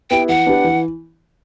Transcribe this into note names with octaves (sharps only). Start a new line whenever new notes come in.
B3 E4 G4 G5
E3 F#5
B3 D4 G4 B4
E3